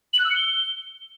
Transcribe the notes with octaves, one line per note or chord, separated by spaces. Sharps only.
F#7
F#6
E6
C#7
G7